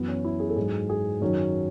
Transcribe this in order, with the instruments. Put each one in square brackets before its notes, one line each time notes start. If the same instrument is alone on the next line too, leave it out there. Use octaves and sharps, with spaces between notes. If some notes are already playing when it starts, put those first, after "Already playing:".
Already playing: [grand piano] F#2 E3 B3
C#4
E4
G#4
A4
G#2 F#3 G#4
G#4
F#2 D#3 F#3 C#4